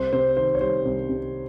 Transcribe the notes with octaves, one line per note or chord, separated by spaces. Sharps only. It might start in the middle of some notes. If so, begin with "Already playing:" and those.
Already playing: C2 C5
C3 C5
D#3 C5
C#5
G3 C5
C2
C3